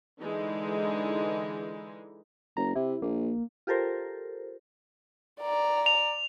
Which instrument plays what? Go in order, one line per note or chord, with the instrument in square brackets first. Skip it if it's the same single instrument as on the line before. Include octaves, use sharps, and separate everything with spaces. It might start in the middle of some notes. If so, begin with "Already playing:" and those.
[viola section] D3 E3 G#3 D#4
[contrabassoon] F#1 [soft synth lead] A#5
[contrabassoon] C3 [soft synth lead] E4
[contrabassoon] A#1 [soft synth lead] A#3
[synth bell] F4 G4 A4 A#4 C5
[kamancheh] D5 A#5
[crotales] F7